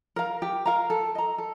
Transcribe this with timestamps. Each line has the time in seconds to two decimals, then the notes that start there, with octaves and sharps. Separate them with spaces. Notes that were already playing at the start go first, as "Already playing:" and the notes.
0.16 A#4 F5 A#5
0.42 G4
0.66 A#4 F5 A#5
0.90 A4
1.15 D#5 A#5
1.38 A4